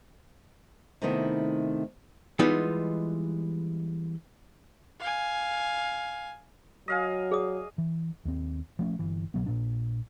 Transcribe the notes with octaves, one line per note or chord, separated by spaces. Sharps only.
C3 D#3 A3 B3 D#4 E4
E3 G3 G#3 B3 D#4 F4
F5 G#5
F#3 D#5 F5 G#5
G#4 D5 D#6
E3
D#2 C4
F3 A3 C#4
G1 E3
C2 B2 F#3 B3
A#1 A#2 D4